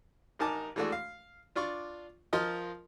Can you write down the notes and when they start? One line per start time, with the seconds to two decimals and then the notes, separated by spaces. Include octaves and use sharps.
0.39 A1 D#4 A#4 G#5 A5 D6
0.76 E3 G#3 A3 D4 F#4
0.92 F5
1.55 D4 F4 D5 C#6
2.33 F3 F4 A#4 D#5 F6